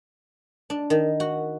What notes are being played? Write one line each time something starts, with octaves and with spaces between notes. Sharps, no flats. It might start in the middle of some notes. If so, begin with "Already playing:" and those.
D4
D#3
F#4